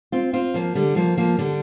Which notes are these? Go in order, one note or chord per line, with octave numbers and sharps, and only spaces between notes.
C4 F4
C4 F4
F3 A#3
D3 G3
F3 A#3
F3 A#3
D3 G3